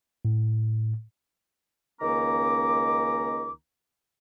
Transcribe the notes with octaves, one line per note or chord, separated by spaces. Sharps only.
A2
C#2 D#3 A#3 C#4 A#5 D6